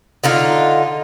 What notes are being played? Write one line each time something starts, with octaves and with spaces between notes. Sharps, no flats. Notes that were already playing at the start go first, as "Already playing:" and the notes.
D3 D#4 F4